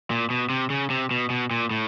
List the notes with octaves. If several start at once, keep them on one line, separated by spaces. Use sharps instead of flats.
A#2
B2
C3
C#3
C3
B2
B2
A#2
A2